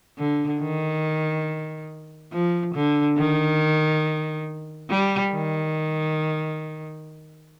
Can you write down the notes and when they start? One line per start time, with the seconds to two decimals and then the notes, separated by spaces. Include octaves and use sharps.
0.18 D3
0.61 D#3
2.33 F3
2.75 D3
3.17 D#3
4.90 G3
5.33 D#3